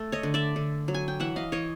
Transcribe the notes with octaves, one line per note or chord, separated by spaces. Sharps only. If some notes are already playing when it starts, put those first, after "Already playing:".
Already playing: A3
C#5 D#5
D3
D5 E5
D3
F#3
G#5
G5
E3 E5 F#5
D#5 F5
E3 C#5 D#5